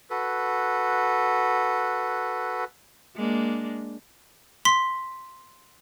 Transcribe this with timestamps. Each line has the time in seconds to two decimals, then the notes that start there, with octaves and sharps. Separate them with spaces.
0.10 F#4 A4 B4
3.16 G#3 A#3 D4
4.65 C6 B6